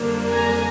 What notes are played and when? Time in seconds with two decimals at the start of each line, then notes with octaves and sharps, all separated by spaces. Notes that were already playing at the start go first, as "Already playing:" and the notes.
Already playing: F2 D3 G3 A#3 D4
0.29 G#5 A#5